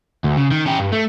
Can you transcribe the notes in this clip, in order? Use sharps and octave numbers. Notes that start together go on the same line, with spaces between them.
D2
C#3
D#3
C#4 G4
G2
A3